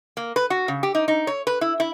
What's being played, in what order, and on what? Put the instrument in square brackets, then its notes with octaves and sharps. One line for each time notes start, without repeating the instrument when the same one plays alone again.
[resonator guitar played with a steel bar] A#3
B4
F#4
C#3
G4
D#4
D#4
C#5
B4
E4
E4